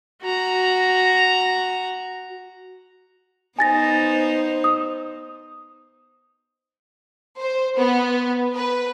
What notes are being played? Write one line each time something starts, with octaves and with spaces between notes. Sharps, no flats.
F#4 A#5
B3 D#4 C5 G#5 A6 A#6
D#6
C5
B3
B4